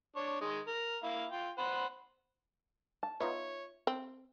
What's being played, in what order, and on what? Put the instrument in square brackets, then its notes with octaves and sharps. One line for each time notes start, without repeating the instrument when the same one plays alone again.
[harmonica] D4 C#5
D#3 G#3
A#4
A#3 E4 F5
F4 G5
C5 F#5 B5
[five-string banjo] A5
[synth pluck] B3 D#4 F4 [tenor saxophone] C#5 [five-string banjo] E5
[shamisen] C4